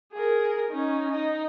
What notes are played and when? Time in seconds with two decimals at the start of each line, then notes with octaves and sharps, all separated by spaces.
0.13 G#4 A#4
0.71 C#4 D#4
1.11 D#4